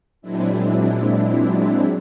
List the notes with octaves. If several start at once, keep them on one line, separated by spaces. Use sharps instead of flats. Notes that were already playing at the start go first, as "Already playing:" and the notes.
A#2 F#3 G#3 C4 D4 E4